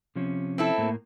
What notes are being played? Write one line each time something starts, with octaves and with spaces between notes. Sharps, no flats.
C3 F3 C#4
C4 E4 A4
A2 A#3